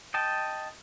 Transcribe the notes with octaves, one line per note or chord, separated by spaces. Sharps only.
D#5 G5 A5